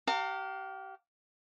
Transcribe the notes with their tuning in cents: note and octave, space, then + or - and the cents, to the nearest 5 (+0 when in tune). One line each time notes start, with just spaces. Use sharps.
G4 -30 F5 +20 A#5 -35